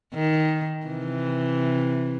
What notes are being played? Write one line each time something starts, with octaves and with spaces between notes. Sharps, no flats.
D#3
C3 E3